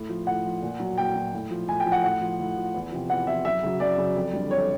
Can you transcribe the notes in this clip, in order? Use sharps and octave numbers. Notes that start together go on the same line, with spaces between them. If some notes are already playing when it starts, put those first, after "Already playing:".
Already playing: A2
F3
A2 F#5
F3
A#2
F#3
A#2 G5
F#3
A2
F3
A2 G#5
G5
F3
F#5
A2 F#5
F3
A2
F3
E2
C3 F3
E2 F#5
C3 F3 E5
F#2 E5
C#3 F#3
F#2 D5
C#3 F#3
F2
D3 G3
F2 C#5